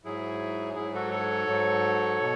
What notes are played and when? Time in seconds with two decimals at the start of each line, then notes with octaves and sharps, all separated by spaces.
0.04 G#2 F#3 E4 G#4
0.75 G#2 F#3 E4 G#4
0.94 F#4 A4
1.11 A4 C#5
1.47 G#2 F#3
2.20 B2